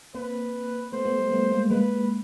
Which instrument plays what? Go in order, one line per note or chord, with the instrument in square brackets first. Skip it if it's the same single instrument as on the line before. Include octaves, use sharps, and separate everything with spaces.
[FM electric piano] A#3 C4 [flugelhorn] B4
[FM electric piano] A3 B3 [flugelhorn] C5
[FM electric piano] A3 B3
G3 A3
A3 B3
G#3 A#3
[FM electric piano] G#3 A#3 [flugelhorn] B4